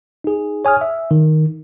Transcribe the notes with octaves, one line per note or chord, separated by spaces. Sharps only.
D#4 G#4
C#5 G#5 D#6 F6
E5
D#3